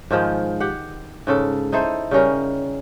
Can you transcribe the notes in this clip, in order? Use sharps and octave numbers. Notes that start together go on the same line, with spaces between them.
G#2 D#3 F3 G#3
G4 F#5
G#2 C#3 A4
D#4 E4 A4 C5
C#3 G3 C#4 A#4